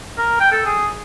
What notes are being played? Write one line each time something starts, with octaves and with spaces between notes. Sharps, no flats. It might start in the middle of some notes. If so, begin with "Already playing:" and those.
A#4
G5
A4
G#4